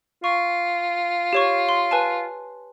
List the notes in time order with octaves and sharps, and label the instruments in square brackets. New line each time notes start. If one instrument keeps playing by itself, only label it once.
[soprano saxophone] F4 [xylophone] C#6
[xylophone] G4 C#5 C#6
C6
B4 G#5 A5